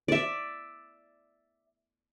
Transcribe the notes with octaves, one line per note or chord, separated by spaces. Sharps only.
D5 E5